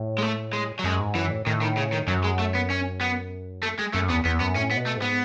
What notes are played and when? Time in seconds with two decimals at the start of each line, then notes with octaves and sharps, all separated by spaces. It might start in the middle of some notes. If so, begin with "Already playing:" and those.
Already playing: A2
0.18 G#3
0.22 A3
0.53 G#3
0.79 F#3
0.84 F#2 G#3
1.00 G#2
1.15 F#2 E3
1.31 A2
1.46 A2 D#3
1.61 D#3
1.77 C#3
1.92 D#3
2.07 F#2 F#3
2.24 G#3
2.39 A3
2.55 B3
2.70 C#4
3.01 B3
3.63 A3
3.78 G#3
3.93 F#2 A3
4.09 E2 B3
4.25 E2 B3
4.40 F#2 B3
4.56 A2 C#4
4.71 B3
4.77 B2
4.86 A3
4.97 G#2 B3